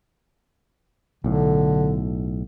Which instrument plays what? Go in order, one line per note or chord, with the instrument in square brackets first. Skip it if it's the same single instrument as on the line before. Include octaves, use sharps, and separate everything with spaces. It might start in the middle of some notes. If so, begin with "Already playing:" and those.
[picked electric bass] B1 A2 [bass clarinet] D3